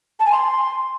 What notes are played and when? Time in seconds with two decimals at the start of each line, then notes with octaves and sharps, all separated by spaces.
0.20 A5
0.26 G#5
0.32 C6